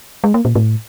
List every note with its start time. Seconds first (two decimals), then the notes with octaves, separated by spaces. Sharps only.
0.24 G#3
0.34 A#3
0.45 A#2
0.55 A2